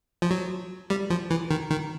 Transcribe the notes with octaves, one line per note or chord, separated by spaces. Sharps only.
F3
F#3
G3
F3
E3
D#3
D#3